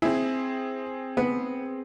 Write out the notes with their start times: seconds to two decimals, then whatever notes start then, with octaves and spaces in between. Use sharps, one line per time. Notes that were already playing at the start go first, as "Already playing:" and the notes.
0.02 C4 E4 G#4
1.17 B3